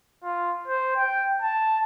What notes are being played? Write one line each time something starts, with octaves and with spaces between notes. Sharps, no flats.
F4
C5
G5
A5